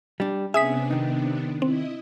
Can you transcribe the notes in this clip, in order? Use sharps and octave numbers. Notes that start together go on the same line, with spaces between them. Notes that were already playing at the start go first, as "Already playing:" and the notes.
G3 D4
C3 B3 C#4 D4 G#4 E5 D#6 B6
D#3 D#4
C4 E4 D#5